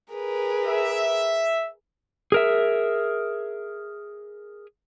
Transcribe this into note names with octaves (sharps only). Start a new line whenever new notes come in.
G#4 A#4 B4
E5
G#4 A#4 E5